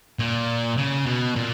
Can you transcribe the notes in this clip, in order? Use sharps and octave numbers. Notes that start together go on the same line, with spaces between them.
A#2
C#3
B2
A#2